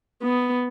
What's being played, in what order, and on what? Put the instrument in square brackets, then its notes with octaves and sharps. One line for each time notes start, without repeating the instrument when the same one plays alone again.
[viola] B3